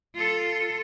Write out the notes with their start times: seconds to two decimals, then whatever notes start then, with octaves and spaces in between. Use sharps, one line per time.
0.15 F4 A4